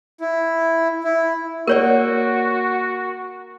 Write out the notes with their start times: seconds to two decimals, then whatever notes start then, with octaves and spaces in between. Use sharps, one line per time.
0.20 E4
1.04 E4
1.67 A#3 F#4 A#4 C#5 D5 F#5